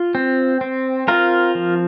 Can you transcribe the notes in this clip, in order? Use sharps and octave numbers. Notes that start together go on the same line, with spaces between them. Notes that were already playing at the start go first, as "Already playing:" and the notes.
Already playing: F4
C4
C4
C4 F4 A#4
F3